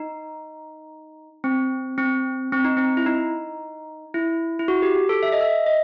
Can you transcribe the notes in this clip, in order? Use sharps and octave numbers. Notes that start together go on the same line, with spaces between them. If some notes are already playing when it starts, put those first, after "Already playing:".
Already playing: D#4
C4
C4
C4
D#4
C4
E4
D#4
E4
E4
F#4
G4
G4
A4
E5
D#5
E5
D#5